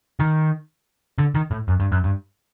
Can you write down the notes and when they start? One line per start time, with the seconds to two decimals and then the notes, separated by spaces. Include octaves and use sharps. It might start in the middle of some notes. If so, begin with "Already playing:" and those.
0.20 D#3
1.18 D3
1.35 D#3
1.51 A2
1.68 F#2
1.80 G2
1.92 F#2
2.04 G2